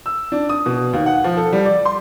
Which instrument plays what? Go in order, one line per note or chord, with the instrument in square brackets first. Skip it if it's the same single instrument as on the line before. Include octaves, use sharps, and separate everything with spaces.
[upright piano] E6
D4
D#6
B2
D#2
F#5
F3
A4
G3
D5
C6